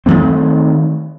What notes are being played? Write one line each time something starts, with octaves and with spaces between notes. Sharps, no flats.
D#3 F3 A3 C4